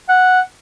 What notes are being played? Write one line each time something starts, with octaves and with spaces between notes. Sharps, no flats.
F#5